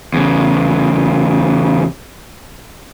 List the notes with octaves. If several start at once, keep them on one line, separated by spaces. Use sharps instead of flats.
E2 C#3